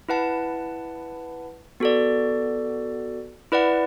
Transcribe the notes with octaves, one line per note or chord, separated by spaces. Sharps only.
E4 B4 F#5 A5
B3 F#4 A4 D5
E4 B4 D5 F#5